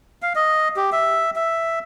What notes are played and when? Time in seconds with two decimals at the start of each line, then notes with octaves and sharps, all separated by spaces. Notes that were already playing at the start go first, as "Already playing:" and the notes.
0.22 F5
0.35 D#5
0.76 G4
0.92 E5
1.36 E5